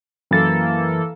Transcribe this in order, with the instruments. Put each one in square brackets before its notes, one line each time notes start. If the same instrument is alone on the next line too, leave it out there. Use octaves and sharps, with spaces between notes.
[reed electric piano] F#2 A6 [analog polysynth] E3 A#3 A4